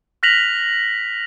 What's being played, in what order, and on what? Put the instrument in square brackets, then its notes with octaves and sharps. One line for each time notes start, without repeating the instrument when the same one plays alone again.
[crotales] F6 F#6 A#6 B6 F7 F#7